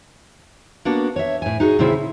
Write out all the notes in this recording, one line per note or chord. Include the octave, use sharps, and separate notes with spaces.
A#3 B3 D4 F#4
C#5 E5
A2 G#5
D#4 F#4 G#4
A#2 C#3 C4 E4 E5
C#3